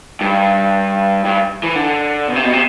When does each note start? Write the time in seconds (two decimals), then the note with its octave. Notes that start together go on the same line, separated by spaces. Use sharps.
0.21 G2
1.25 G2
1.63 E3
1.75 D3
2.28 B2
2.36 C3
2.45 B2
2.53 C3